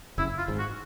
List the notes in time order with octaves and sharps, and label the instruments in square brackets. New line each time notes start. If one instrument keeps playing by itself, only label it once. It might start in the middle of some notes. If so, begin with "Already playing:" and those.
[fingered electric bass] F#1 F#2 [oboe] E4
[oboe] F4
[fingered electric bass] G#1 G#2
[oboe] F#4